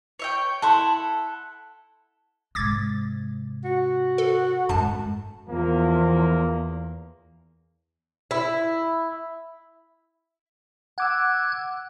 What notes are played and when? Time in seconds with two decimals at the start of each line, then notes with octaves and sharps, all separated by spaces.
0.19 C#5 E5 G5
0.62 E4 A4 F#5 A5 B5 C6
2.55 G#2 C3 D6 G#6 A6
3.64 F#4
4.18 A4
4.69 D1 G#1 F#2 A5
5.49 E2 F3 A#3
8.31 E4
10.98 F#5 D6 E6 F#6 G#6